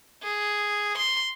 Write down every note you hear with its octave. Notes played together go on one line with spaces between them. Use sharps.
G#4
C6